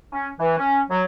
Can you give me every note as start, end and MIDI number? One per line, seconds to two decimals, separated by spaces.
0.12 0.28 61
0.39 0.57 52
0.57 0.80 61
0.90 1.03 54